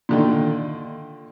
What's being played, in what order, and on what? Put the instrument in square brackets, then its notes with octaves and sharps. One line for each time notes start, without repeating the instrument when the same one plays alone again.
[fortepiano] A#2 D3 D#3